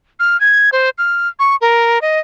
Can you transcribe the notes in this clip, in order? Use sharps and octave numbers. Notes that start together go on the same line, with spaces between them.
F6
G#6
C5
F6
C#6
A#4
D#5